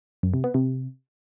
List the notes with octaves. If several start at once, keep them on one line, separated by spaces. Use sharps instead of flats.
F#2
C3
B3
C3